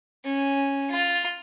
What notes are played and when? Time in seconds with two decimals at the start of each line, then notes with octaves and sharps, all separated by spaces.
0.24 C#4
0.91 F4